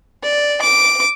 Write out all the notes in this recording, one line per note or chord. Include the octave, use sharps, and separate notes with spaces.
D5
D6